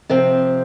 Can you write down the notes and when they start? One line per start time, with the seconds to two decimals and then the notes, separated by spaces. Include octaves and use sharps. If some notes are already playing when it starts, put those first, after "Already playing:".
0.10 C3 F3 C4